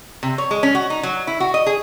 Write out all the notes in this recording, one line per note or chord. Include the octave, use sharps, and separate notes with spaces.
C3
C#5
G#3
C#4
F#4
D#4
F#3
E4
F#4
D#5
G#4